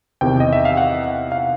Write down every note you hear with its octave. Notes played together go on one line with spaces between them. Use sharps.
E2 C3 D#3 G5
D#5
E5
F5
F#5
F5